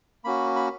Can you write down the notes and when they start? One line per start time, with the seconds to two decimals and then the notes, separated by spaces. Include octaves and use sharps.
0.24 A#3 C#4 F#4 B5
0.56 B5